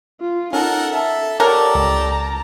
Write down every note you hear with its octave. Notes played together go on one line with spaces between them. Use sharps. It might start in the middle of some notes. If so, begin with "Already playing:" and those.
F4
C#4 D#4 A4 A#4 F#5
A4 E5
G4 A4 A#4 C#5 D5 F#5 A5 A#5
C#2 A5 A#5